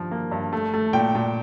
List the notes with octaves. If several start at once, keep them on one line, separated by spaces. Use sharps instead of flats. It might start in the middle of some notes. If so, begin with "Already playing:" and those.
Already playing: G2 F3
A#3
G2
A3
A3
A#2 G5
A#2